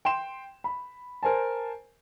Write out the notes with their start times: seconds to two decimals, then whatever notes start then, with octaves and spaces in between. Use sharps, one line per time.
0.05 G5 C6 E7
0.64 B5
1.23 A#4 C5 G#5 A5